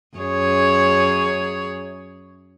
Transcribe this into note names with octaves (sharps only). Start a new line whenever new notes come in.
F#2 G#4 C#5